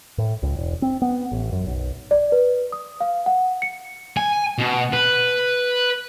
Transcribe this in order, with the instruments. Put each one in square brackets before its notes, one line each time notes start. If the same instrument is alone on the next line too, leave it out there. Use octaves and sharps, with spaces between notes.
[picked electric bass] A2
C#2
E1
C4
B3
A1
F#2
B1
[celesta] D5
B4
D#6
F5
F#5
C#7
[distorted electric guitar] G#5
B2
B4